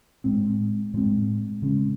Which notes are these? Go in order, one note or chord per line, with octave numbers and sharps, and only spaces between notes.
A2 G#3 C4
A2 G#3 C4
C#3 G#3 C#4